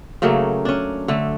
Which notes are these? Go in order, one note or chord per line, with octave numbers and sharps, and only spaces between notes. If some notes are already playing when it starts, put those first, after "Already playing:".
C#3 F#3 A3 A#3
C#4 D4
D3 A3